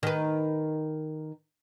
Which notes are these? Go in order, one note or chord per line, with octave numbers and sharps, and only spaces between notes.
D#3 B4